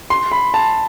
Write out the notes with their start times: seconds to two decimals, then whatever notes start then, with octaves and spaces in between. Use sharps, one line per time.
0.10 C6
0.32 B5
0.54 A5